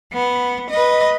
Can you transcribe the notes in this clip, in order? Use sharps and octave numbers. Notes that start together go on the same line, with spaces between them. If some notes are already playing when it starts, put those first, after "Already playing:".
B3
B4 D#5